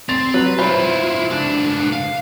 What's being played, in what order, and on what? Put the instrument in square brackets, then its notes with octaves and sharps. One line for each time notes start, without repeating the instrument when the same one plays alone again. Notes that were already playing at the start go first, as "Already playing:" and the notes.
[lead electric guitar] C4 [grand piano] A6 F7
[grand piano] F#3 [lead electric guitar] B4
[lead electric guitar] E4 F4 [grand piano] C5 B5
[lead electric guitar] C#2 D4
F5